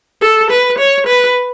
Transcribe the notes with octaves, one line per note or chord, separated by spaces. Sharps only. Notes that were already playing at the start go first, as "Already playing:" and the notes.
A4
B4
C#5
B4